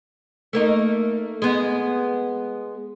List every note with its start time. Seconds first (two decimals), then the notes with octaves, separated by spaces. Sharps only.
0.53 A3 A#3 D#4
1.42 G#3 B3